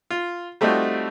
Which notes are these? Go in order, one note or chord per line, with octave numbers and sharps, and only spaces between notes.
F4
G3 A3 C4 D#4 F4 F#4